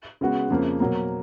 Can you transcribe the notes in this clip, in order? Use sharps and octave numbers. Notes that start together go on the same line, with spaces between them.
C#3 G#3 B3 F#4
F2 C#3 F3 A#3
B2 F#3 A#3